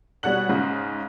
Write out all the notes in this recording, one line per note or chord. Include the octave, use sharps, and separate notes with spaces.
B2 G3 C#5 F#5 F#6 F#7
G#2 C#3